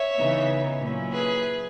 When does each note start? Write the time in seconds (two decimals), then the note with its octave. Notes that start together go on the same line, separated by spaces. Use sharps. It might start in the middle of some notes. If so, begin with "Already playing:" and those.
Already playing: C#5 E5
0.16 C#3 E3 B3 D#4
0.80 A#2 F#3 C#4 E4
1.12 G#4 B4